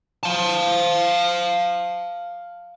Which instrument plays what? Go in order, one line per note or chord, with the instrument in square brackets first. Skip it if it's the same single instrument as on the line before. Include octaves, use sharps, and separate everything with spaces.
[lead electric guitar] F5 A5